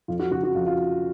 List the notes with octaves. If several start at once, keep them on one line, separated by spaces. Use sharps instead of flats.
F2 F4
F#4
C#3 F#4
F#4
F2 F4
F4